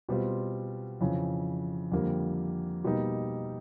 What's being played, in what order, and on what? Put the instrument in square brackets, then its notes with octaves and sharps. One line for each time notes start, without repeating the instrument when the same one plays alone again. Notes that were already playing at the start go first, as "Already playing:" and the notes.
[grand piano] B2 G3 C4 F4
F2 C#3 E3
F2 D3 G3 A#3
B2 G3 A#3 D#4